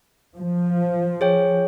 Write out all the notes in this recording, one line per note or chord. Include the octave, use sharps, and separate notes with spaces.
F3
G#4 C#5 G5